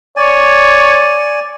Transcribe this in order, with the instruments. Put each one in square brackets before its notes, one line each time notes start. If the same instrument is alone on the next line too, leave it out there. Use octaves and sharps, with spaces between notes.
[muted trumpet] C#5 [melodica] D5 G#5